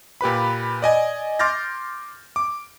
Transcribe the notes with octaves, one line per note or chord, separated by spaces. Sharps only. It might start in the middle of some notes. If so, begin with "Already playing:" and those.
A#2 G4 B4 B5
D5 D#5 G#5
C6 D6 F6 G6 A6 A#6
D6